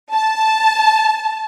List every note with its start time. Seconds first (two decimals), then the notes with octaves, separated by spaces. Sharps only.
0.13 A5